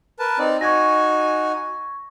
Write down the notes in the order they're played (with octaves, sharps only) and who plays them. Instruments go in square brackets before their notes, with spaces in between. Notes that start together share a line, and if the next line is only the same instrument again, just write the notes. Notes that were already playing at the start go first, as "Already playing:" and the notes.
[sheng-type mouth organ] A#4 B4 A5
C4 D#4 D5
[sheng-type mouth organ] D#4 F#4 G#5 [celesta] C#6 G#6 A#6